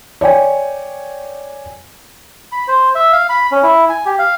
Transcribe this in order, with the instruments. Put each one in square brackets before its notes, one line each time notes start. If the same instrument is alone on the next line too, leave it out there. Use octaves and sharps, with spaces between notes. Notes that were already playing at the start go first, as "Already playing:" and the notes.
[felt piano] C#5 D5 G5 G#5
[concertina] B5
C5
E5
F5
B5
C#4
E4
G#5
G4
F5